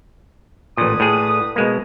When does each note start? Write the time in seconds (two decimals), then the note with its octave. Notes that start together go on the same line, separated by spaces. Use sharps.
0.77 A1 A#2 D3 B4 D#6
1.00 A2 G#4
1.56 B2 G#3 A#3